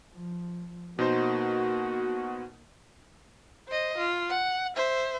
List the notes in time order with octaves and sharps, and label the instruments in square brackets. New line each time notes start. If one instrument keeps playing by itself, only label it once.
[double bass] F3
[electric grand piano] B2 D#4 C5 [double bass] A#3 [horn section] F#4
[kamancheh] C5 D#5
F4
F#5
C5 E5